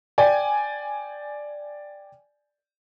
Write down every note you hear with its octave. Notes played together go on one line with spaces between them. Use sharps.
D5 G5 G#5